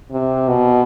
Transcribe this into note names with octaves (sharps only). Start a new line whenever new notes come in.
C3
B2